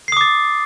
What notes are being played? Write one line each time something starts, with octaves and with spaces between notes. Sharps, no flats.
D6 D#6 A6 C7